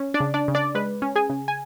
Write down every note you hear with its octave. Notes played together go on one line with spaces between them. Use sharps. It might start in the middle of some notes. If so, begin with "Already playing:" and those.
Already playing: C#4
D4 D5
C#3
D4 D5
C#3
D4 D5
G#3 B4
C#4
G#4 G#5
C#3
G#5